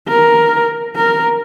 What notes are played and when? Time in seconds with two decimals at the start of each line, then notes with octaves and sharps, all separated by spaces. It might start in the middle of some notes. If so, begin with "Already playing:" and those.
0.08 A#4
0.96 A#4